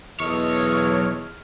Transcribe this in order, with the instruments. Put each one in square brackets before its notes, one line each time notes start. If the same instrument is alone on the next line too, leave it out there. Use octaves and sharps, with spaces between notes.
[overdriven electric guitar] B1 C#5 [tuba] E2 [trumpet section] A4 D#5 [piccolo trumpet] F6